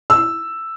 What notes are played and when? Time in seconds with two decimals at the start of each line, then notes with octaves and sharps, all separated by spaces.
0.10 E6